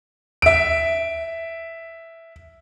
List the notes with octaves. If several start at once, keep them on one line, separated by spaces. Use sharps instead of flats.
E5 D7